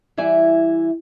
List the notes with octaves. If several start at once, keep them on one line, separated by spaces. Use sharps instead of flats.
E3 G3 E4 D5 G#5